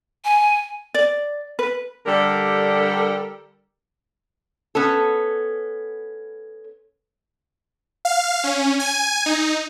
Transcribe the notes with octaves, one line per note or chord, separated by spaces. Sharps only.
G#5
D5
B4
D3 G3 G4 A4 A#4
B3 C#4 A4
F5
C#4
G#5
D#4